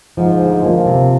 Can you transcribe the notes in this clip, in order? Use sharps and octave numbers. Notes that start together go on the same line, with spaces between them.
G#2 F3
D2
F3 A#3
C3